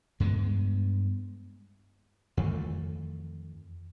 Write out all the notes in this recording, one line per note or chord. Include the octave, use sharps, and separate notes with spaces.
G2 G#3 A#3 B3
F2 D#3 E3 A3